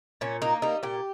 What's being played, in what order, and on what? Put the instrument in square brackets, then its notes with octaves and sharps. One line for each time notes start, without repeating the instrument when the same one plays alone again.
[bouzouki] A#2 C#4
A#3 D#4
G3 D#4
A#2 G4